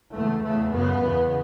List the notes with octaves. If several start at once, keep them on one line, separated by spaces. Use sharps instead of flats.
E2 C#3 A3
E2 C#3 A3
F#2 C#3 B3
E2 C#3